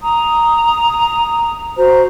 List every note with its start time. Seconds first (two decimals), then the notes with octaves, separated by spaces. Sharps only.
0.01 A#5 D#6
1.76 F#4 C5 A#5